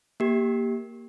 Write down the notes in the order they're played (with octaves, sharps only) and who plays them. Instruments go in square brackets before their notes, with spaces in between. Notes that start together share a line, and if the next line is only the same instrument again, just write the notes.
[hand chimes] A#3 G4